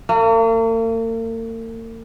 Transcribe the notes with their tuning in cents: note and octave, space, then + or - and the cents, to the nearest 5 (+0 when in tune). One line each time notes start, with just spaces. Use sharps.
A#3 -45